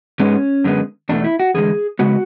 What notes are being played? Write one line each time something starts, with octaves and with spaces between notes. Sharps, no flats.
G#2 G#3 B3 C#4
F#2 D3 G#3 B3
E2 B2 A3 D4
E4
F#4
E2 D3 G#3 G#4
C#3 G#3 B3 F#4